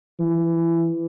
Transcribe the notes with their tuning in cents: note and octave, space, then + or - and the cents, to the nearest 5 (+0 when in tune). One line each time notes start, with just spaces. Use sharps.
E3 +20